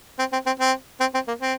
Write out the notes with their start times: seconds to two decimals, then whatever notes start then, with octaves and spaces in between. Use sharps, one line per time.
0.19 C4
0.33 C4
0.46 C4
0.60 C4
1.00 C4
1.14 C4
1.28 A#3
1.41 C4